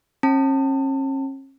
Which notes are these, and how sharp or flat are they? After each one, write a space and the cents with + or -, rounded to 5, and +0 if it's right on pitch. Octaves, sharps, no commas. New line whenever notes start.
C#4 -40 A5 +25